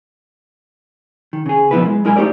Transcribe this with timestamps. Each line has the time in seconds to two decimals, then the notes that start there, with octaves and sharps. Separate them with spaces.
1.33 D#3
1.46 C#3 G#4
1.71 B2 F3 B3 E4 A#4 B4
1.86 G#3
2.04 B1 G#3 E4 A#4 G#5
2.16 A3 A#3 D#4 G4 C5 D5